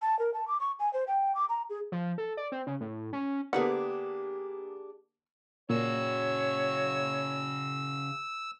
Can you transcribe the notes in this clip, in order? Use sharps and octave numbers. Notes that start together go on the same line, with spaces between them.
A5
A#4
A5
D6
C#6
G#5
C5
G5
D6
A#5
G#4
F3
A4
D5
C4
C#3
A2
C#4
D3 A#3 B3 D4 G4 G#4 F#5
A#2 C#3 F#4 C#5 E6